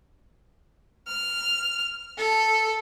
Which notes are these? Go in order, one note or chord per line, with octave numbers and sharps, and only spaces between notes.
F6
A4